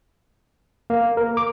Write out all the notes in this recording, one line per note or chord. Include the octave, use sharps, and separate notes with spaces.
A#3
A#4
D6